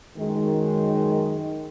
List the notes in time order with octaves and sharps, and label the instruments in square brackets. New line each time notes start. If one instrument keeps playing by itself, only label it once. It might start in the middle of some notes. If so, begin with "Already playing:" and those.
[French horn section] F#2 D#3 G#3